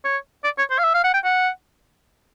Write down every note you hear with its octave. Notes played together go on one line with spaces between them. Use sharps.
C#5
D5
C#5
C5
F5
E5
F5
F#5
G5
F#5